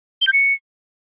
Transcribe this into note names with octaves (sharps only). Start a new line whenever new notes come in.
G7
G6
C#7